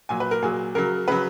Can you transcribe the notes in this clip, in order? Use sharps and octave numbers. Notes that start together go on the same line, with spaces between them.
A#2 F#3 G#5
B4
A#4
A#2 F#3 G#4
C#3 F#3 A#4
C#3 F#3 B4